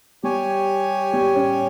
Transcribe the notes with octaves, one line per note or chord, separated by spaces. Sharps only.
G3 G4 C#5 G#5
G3
C#4